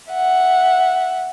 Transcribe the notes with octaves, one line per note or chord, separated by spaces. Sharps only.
E5 F#5